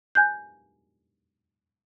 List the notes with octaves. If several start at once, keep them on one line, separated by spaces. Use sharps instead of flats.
G#5 F#6 G6